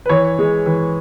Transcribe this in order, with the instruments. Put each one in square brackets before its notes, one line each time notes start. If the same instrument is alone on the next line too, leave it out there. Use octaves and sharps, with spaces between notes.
[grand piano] B4
E3 C#5
G#3
E3